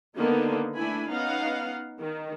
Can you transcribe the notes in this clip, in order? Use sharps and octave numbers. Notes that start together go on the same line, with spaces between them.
D3 D#3 A#3 B3 D#4
A3 D4 E4 G#5 B5
B3 C#4 D#4 F5 F#5
D#3